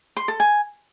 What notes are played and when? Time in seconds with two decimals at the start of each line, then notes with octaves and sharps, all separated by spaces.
0.17 C6
0.28 A4
0.40 G#5